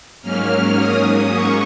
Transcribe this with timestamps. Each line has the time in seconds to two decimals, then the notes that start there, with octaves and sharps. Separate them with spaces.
0.22 G#2 F#3 A#3 C#4 F6
0.78 D#6
1.32 C#6